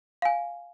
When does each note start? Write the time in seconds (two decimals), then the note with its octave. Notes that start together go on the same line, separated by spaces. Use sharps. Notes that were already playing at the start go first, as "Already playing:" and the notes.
0.22 F5 G#5